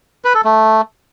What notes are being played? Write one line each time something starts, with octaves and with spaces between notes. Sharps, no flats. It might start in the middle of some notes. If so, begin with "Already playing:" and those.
B4
A4
A3